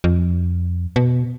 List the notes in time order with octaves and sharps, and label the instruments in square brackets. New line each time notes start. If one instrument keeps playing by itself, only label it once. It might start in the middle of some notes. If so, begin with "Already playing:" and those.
[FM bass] F2
B2